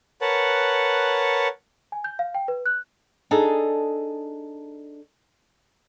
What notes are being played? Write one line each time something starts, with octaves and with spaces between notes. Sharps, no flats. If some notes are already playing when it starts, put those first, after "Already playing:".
A#4 B4 C#5 F#5 A5
G#5
G6
F5
G5
B4
F#6
D4 D#4 G#4 A4